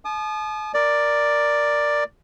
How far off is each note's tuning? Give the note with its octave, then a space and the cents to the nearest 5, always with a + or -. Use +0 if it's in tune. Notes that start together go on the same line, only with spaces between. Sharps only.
A5 -45 D#6 -35
A#4 +0 D5 +5